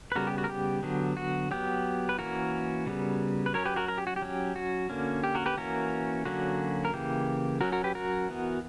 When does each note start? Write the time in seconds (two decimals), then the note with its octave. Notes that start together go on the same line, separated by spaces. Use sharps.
0.12 B4
0.15 C#3 G3 B3 F#4 A#4
0.27 G4
0.38 F#4
0.44 A#4
0.49 G4
0.83 D3 F#3 B3
1.17 F#4
1.51 F#3 B3 G4
2.09 B4
2.18 E3 A#3 C#4 F#4 A#4
2.87 C#3 G3 B3
3.46 B4
3.54 F#3 C#4 A#4 C#5
3.66 G4 B4
3.76 F#4 A#4
3.88 A#4
3.98 G4
4.07 F#4
4.16 G4
4.22 F#3 C#4
4.56 F#4
4.90 D3 A#3 C#4
5.24 G4
5.35 F#4 A#4
5.46 G4 B4
5.57 E3 A#3 C#4 F#4 A#4
6.25 D3 F#3 A#3 C#4 F#4
6.85 A#4
6.93 C#3 E3 A#3 G4
7.61 F#3 C#4 F#4 A#4
7.72 F#4 A#4
7.84 G4 B4
7.95 F#4 A#4
8.29 E3 B3